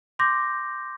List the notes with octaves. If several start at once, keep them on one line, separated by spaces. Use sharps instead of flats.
C6 D6 G6 A#6